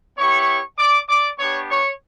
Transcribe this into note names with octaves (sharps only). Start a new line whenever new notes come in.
B3 E4 G4 C#5 C#6
D5 D6
D5 D6
B3 D4 G4 C#5 C#6
C#5 C#6